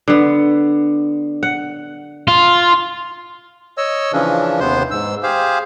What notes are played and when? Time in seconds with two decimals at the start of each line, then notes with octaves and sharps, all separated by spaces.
0.08 D3 B3
1.43 F#5
2.28 F4
3.77 C#5 D#5 E6
4.13 C#3 E3 F3 C#4 D4
4.60 D#2 C3 B3 C5 C6
4.91 G#2 E6
5.23 G4 G#4 C5 F5